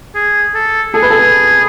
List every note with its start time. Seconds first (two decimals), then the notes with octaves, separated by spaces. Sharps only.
0.15 G#4
0.55 A4
0.94 G#4 A4
1.02 B4
1.10 A4